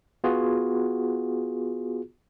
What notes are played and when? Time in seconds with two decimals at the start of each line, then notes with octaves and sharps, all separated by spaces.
0.24 B3 F4 F#4 G#4